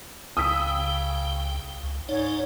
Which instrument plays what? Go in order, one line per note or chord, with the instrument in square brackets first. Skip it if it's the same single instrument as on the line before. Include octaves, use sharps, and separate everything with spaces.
[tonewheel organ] C#2 G5 [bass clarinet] C#3 [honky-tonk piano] D#6 E6 B6
[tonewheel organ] C#2
[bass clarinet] G#2 [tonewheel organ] D#4 D5 [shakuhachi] C#5